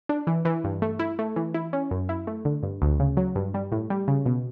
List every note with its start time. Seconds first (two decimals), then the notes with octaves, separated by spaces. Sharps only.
0.09 D4
0.27 E3
0.45 E3
0.64 G2
0.82 A3
0.99 E4
1.19 A3
1.36 E3
1.54 E4
1.73 C#4
1.91 F#2
2.09 E4
2.27 A3
2.45 D3
2.63 G2
2.82 D2
3.00 C#3
3.17 F#3
3.36 G2
3.54 G3
3.72 A2
3.90 G3
4.08 C#3
4.26 B2